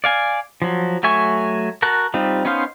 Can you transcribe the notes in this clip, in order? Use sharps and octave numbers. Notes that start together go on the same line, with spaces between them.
D5 F5 G#5
F3 F#3
F#3 A3 E5 G#5 C#6
F#4 A#4 A5 F#6
G3 C4 D#4 F4
B3 C#4 D#4 C5 F5